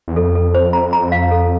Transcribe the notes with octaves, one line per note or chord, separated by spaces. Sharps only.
E2
F2 A4
A4
C5
A#5
A#5
F5
A4